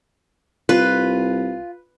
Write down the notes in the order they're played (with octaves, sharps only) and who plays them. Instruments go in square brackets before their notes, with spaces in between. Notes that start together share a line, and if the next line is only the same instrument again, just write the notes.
[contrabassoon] C2 [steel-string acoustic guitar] F4 [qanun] B4